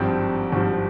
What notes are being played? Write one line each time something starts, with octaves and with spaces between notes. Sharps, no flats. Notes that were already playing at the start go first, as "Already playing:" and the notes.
Already playing: G#1 G2 F3 C4
G#1 G2 F3